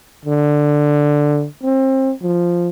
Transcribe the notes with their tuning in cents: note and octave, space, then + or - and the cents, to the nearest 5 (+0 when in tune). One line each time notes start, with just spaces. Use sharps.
D3 +5
C4 +30
F3 +0